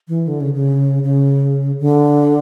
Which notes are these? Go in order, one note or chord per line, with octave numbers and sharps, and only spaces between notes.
E3
D3
C#3
C#3
C#3
D3